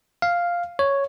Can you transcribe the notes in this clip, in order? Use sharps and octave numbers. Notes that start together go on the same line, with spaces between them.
F5
C#5